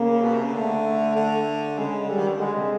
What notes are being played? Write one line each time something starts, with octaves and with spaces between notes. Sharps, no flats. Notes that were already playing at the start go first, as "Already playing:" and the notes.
Already playing: C#3 A#3
B2
C3
C#3
D3 A3
D3
C#3 G#3
D3 G3
D#3
D3
D3 G#3
C3